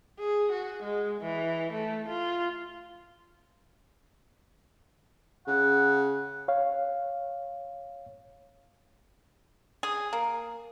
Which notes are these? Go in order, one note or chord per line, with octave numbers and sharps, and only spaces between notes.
G#4
F#4
G#3
E3
A3
F4
C#3 F#5
C#5 F5
G#4
A#3